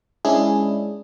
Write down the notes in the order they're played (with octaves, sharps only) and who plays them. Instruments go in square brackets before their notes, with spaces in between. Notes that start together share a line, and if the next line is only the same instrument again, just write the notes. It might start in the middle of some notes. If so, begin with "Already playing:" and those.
[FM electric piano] G#3 C#4 D4 E4 G#4